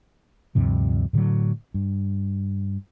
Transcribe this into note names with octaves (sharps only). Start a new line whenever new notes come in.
D2 G2 C3 F3
A2 D3 F3 F#3
G2